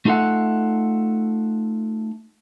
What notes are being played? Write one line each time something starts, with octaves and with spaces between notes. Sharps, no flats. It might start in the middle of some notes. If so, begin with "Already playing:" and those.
A3 D#4 F4 A4 E5 F#5